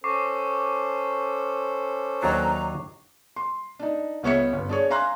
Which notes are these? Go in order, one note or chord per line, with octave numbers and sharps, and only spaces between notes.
C#4 A4 C5 C#6 D6 C7
D#2 F#3 D4 A#5
C6
D4 D#4
C#2 B3 C#5 E5 C#7
G1
D4 G#4 C#5
E5 F5 G#5 A#5 C6 F#6